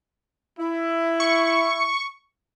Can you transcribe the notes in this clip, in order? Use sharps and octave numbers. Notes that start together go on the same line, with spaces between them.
E4
C#6